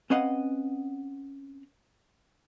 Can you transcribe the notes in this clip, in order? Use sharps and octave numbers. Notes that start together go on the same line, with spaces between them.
C4 C#4 B4 D#5 F5 F#5